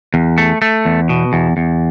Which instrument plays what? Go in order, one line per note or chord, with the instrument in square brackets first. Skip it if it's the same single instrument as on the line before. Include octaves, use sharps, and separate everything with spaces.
[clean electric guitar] E2
A3
A3
E2
B2
E2
E2